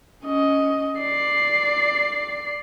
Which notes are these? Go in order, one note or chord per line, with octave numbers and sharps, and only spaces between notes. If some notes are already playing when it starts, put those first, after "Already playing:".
C#4 D#5
D5 C7